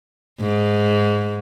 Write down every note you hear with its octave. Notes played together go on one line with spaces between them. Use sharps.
G#2